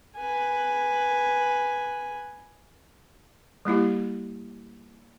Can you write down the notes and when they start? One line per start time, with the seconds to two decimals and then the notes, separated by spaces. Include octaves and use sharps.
0.17 B4 G#5
3.65 G3 A#3 E4 G4